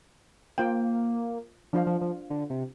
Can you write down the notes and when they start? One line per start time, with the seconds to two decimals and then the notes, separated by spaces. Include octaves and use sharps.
0.58 A#3 F4 C5 G5
1.73 F3 D4 F4 C5 F5
1.87 F3
2.01 F3
2.30 D3
2.50 C3